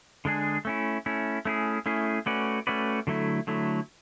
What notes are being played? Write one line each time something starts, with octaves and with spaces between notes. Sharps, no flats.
D3 G#3 D4 G#4
A3 C#4 E4
A3 C#4 E4
A3 C#4 E4 G#4
A3 C#4 E4 G#4
A3 C#4 F#4 B4 D5
A3 C#4 F#4 B4 D5
D3 F#3 A3 E4
D3 F#3 A3 E4